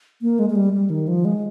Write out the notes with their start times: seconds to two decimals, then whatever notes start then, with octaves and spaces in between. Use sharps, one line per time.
0.22 A#3
0.39 G#3
0.50 G#3
0.55 G3
0.73 G3
0.90 D#3
1.08 F3
1.25 G#3